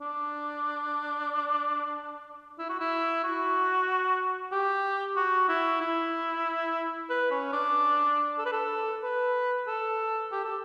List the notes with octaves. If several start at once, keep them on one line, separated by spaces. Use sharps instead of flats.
D4
E4
F#4
E4
F#4
G4
F#4
E4
E4
B4
C#4
D4
A4
B4
A4
B4
A4
G4
A4